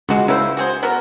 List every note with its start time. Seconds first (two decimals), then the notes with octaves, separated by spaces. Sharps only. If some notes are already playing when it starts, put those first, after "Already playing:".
0.09 C#2 G#3 B3 F#4
0.28 C#3 E4 B4 C5
0.57 F#4 G#4 C5
0.83 B3 F#4 A#4